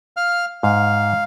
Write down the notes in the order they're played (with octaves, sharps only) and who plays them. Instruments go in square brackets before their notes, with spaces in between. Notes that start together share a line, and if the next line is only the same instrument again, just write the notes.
[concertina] F5 F6
[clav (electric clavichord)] G#2 [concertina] F5